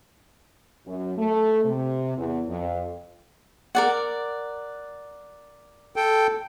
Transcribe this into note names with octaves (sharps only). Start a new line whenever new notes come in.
F#2
A3
C3
E2
F2
A#4 D5 F#5
A4 G5